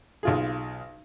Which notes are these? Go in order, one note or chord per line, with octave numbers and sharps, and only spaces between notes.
B1 F4 G#4